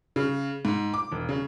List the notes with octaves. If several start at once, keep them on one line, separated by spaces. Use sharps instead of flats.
C#3
G#2
D6
E1
C#3